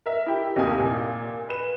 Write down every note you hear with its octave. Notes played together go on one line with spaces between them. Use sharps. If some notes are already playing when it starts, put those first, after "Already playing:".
A#4 E5
E4 G4
D#2 C3 A#3 G#5 D#6
A#2
B4 E7